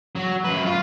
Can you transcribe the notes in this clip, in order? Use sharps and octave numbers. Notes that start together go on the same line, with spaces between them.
F#3
F#2 B4
F4